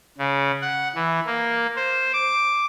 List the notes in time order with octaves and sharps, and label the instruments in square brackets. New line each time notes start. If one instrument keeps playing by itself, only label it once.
[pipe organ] C#3
F#5
E3
A#3
C5
D6